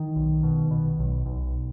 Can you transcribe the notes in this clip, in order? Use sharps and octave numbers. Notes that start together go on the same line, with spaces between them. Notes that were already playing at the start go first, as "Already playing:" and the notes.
Already playing: D#3
B1
B2
B2
B1
B1